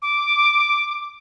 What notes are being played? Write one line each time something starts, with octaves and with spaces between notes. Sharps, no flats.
D6